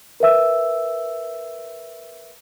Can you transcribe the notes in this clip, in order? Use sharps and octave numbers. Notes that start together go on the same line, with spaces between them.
A#4 B4 E5 E6